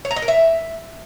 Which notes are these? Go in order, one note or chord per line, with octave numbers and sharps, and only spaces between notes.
C#5
A#5
D#5
A#4
E5